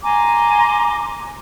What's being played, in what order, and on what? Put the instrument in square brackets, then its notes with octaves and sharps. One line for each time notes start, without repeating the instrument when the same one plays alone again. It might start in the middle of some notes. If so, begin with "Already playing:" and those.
[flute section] G#5 A#5 C6 D6